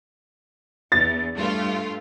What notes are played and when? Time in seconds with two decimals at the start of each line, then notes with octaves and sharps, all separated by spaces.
0.92 E2 A6
1.35 G2 A3 F4